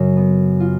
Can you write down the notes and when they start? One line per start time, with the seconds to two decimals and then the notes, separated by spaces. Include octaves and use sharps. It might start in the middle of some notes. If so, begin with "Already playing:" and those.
Already playing: F#2 C#3
0.16 B3
0.60 F4